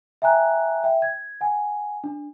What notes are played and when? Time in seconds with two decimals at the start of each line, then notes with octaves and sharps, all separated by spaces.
0.22 E5 G5 G#5 A#5 F#6
0.84 E5 G5
1.02 G#6
1.41 F#5 G#5
2.04 D4